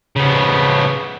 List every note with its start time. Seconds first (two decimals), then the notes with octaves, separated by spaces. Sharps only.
0.16 C#3 B3